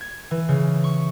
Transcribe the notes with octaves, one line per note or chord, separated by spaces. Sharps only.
G#6
E3
C#3
C#6